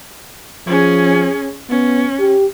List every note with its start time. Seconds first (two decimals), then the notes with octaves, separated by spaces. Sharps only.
0.67 F3 C#4 G#4
1.70 B3 C#4
2.19 G4